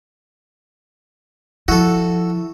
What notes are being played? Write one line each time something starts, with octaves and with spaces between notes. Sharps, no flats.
F3 E4 F#4 A4